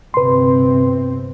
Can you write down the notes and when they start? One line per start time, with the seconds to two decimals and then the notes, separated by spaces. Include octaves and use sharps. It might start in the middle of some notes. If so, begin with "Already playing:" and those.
0.14 G1 C3 C4 B4 C6